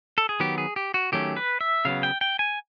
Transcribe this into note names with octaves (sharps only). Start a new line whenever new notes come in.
A4
G#4
D#3 F#3 B3 G4
G#4
G4
F#4
D#3 F#3 A3 C#4 G4
B4
E5
C#3 F#3 B3 F5
G5
G5
G#5